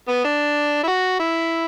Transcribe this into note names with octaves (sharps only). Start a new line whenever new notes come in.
B3
D4
E4
F#4
E4